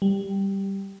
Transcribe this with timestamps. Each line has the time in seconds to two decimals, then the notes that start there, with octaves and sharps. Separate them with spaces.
0.02 G3